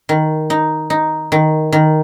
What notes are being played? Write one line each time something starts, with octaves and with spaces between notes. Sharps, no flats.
D#3
D#4
D#4
D#3
D#3